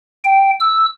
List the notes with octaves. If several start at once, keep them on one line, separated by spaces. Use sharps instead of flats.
G5
E6